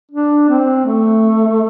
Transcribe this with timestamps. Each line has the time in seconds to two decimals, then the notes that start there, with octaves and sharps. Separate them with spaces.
0.12 D4
0.49 C4
0.86 A3